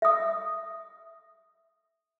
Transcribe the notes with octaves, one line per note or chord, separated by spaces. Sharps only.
E5 D#6